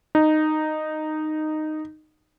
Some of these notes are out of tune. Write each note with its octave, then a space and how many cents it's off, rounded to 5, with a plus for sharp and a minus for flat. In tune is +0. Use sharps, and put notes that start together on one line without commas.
D#4 -10